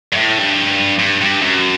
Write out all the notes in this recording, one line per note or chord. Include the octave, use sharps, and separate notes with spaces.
G2
A2
G2
G2
G2
F#2